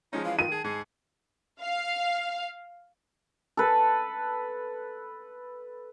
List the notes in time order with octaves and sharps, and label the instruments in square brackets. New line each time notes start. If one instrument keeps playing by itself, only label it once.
[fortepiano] F3 G#3 C#4 [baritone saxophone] D#4
[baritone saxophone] E3 [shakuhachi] F5
[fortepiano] D#3 [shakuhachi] F4 [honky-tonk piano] D#7
[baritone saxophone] G#4 [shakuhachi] A5
[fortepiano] G#2 [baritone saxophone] G#4
[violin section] F5
[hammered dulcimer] A4 B4